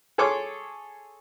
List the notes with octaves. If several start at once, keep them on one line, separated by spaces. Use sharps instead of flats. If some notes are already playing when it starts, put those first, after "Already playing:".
G#4 A4 C#5 C6 D6